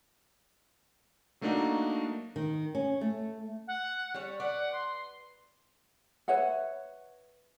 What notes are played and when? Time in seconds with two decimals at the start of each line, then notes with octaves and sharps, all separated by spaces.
1.41 F#3 A3 A#3 D4 D#4 F#4
2.36 D#3
2.75 C#4
3.01 A3
3.67 F#5
4.14 G3 C#5
4.40 B4 D5 F#5
4.72 C6
6.28 B4 C#5 E5 F#5